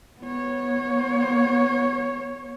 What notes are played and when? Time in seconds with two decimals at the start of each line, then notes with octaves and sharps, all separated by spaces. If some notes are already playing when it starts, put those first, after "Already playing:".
0.21 B3 C#5